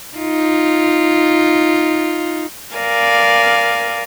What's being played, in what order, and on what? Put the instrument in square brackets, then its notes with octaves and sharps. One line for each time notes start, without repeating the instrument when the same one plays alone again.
[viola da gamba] D#4 F4
[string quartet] A#4 D5 F5 G#5